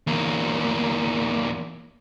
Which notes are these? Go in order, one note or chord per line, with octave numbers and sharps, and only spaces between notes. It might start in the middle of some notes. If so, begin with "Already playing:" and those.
E2 A#3